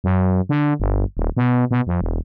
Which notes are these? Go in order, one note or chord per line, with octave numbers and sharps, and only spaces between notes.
F#2
D3
G1
D#1
B2
B2
F2
E1